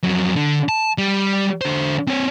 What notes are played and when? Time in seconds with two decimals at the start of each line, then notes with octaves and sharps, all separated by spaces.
0.03 F2 F#3
0.36 D3
0.69 A5
0.98 G3
1.61 D3 C5
2.08 C4 C#5